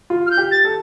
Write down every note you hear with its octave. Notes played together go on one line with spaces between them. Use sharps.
F4
F6
G6
G4
A6
A4